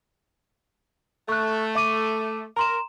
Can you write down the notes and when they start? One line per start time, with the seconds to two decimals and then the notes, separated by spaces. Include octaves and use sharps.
1.29 A3 C#6 F#6
1.75 E5 D6 D#7
2.57 A#4 A#5 C6 E7